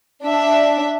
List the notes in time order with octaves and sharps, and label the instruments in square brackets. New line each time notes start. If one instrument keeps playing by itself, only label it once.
[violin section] D4 E5